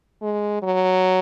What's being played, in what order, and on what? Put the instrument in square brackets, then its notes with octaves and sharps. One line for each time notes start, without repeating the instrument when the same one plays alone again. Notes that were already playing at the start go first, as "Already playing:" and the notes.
[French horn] G#3
F#3